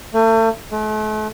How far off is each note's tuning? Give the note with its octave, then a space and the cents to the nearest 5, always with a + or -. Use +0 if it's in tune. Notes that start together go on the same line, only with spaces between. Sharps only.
A3 +35
A3 -40